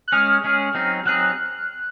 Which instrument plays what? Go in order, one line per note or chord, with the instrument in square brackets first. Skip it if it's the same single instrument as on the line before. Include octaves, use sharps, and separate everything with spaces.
[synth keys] F#6
[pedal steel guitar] G#3 C#4 G#4 [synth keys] F6
[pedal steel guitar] G#3 C#4 G#4
F#3 C4 D#4 G#4
[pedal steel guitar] F#3 C4 D#4 G#4 [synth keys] F#6